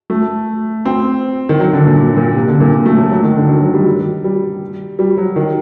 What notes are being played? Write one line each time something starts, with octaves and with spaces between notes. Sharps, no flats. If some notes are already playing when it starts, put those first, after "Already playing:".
A3
C4
D#3
F#3
D3
A#2
A#2
A#2
C3
D3
A#2
A#2
A3
F#3
F#3
D#3
D3
D#3
F#3
G3
G3
G3
F#3
D#3